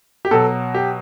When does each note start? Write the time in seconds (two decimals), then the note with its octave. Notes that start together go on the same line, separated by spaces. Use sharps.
0.25 G4
0.31 B2 F#3 A4
0.75 G4